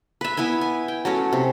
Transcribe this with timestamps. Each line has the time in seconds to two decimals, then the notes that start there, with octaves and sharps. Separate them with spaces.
0.21 B4 E5
0.37 B3 E4 B4 G#5
0.61 G#5
0.88 G5
1.05 F#3 A3 C#4
1.33 C3